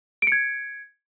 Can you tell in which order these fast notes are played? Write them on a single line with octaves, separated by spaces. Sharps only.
D7 C#7 G#6